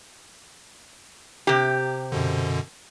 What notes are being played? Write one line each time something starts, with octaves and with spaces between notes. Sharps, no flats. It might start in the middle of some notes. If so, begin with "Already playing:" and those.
C3 G4
F#2 B2 D3